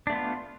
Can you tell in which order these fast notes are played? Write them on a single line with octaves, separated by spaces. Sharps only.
D4 A3 B3 F4